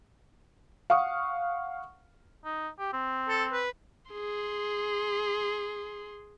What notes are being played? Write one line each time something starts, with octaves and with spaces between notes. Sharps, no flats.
F5 F#5 C#6 D#6
D#4
G4
C4
A4
B4
G#4 C6